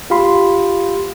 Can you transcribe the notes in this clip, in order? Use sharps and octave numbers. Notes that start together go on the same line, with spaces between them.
F4 G4 F5 B5 C6